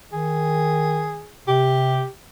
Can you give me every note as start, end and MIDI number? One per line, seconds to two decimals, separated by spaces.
0.13 1.25 51
0.13 1.31 68
1.48 2.03 48
1.48 2.09 67